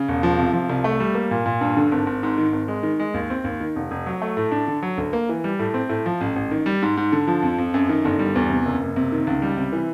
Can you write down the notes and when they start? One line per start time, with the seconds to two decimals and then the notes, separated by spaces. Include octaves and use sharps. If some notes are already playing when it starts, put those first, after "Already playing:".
Already playing: C#3
0.08 E1
0.23 F3
0.39 C3
0.53 F3
0.70 C2
0.84 A3
1.00 G3
1.15 A#3
1.31 A#2
1.46 A#2
1.61 G2
1.77 D3
1.92 G#1
2.07 G#1
2.23 G#2
2.38 D#3
2.53 G#1
2.68 G#3
2.83 D#3
3.00 G#3
3.14 D#2
3.30 C4
3.44 D#2
3.60 D#3
3.76 F1
3.91 F1
4.06 F#3
4.22 A3
4.37 A2
4.51 D4
4.67 D3
4.82 F#3
4.98 D2
5.13 A#3
5.29 E3
5.44 G3
5.59 A2
5.74 C4
5.89 A2
6.06 F3
6.21 A1
6.36 A1
6.51 D#3
6.66 G3
6.82 G#2
6.97 G#2
7.12 D3
7.27 F3
7.43 F2
7.58 F2
7.74 F#2
7.89 D#3
8.05 G1
8.19 G3
8.35 E2
8.50 C3
8.65 F#1
8.82 F#1
8.96 C3
9.12 D#3
9.27 C#2
9.42 G3
9.57 C3
9.72 E3